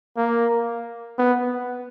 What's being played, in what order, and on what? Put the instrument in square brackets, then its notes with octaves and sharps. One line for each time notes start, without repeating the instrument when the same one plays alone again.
[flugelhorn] A#3
B3